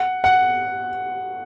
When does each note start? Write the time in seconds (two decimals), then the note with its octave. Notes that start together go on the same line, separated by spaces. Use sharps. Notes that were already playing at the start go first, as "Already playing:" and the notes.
Already playing: F#5
0.24 F#5